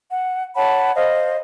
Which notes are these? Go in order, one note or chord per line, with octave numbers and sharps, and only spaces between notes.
F#5
C#5 F#5 A5 B5
C5 D#5 F5